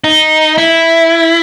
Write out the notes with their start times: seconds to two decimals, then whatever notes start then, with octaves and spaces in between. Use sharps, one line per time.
0.04 D#4
0.58 E4